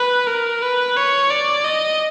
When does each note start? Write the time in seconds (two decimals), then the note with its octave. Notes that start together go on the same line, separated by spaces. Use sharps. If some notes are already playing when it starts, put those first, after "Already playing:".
Already playing: B4
0.27 A#4
0.62 B4
0.96 C#5
1.30 D5
1.64 D#5